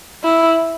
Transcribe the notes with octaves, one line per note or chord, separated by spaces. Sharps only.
E4